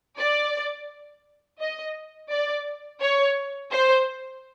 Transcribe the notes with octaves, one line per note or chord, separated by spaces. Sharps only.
D5
D#5
D5
C#5
C5